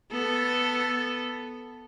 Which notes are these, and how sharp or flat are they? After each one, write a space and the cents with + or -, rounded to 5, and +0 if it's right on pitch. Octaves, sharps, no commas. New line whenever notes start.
B3 +0 A4 +0